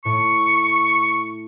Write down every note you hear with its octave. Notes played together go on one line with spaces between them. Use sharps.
A2 C#6